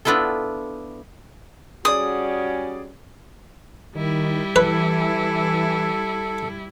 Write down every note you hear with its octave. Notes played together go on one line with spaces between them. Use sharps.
B3 D4 E4 F4 A4
G3 C#4 F#4 G#4 D5 D#6
D#3 G3 E4
E3 A4 B4